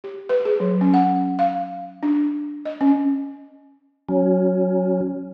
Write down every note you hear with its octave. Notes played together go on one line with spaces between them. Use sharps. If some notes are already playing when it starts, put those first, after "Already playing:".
G4
B4
G#4
F#3
C#4
F#5
F5
D4
D#5
C#4
F#3 C#4